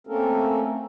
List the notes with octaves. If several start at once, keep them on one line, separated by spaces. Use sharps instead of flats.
A3 A#3 C4 C#4 A4 A#4